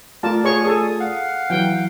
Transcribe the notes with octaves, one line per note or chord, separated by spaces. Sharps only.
A3 F4 A#4 D5 A5
G#4 C#5 C#6
G#4 A4 D#6
F5 F#5
E3 F#3 G5